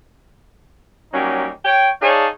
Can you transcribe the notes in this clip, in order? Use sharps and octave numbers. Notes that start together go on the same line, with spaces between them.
F#3 G3 A#3 C#4 D#4 G4
C#5 G5
D#4 G#4 C#5 D5 F5 A5